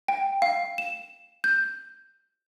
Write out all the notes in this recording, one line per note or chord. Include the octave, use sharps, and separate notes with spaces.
G5
F5
E7
G6